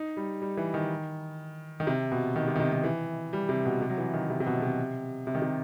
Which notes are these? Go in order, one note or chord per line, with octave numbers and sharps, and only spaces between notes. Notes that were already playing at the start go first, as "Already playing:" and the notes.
Already playing: D#4
G3
G3
E3
D#3
D#3
C3
B2
D#3
C3
D#3
C3
D#3
E3
G3
C3
B2
C3
F#3
E3
D#3
C3
C3
B2
C3
C3
D#3
C3